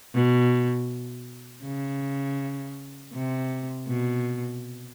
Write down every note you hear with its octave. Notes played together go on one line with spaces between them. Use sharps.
B2
C#3
C3
B2